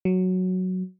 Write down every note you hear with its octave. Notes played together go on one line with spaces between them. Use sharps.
F#3